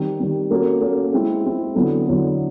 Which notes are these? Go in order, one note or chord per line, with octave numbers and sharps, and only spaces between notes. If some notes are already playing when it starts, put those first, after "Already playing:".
Already playing: D#3 G3 C4
D#3 G3 C4
A#3 C#4 F#4 A4
A#3 C#4 F#4 A4
G#3 C4 E4
G#3 C4 E4
D3 F#3 B3 E4 A4
D3 F#3 B3 E4 A4